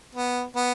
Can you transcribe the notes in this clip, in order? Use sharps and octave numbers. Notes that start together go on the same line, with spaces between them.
B3
B3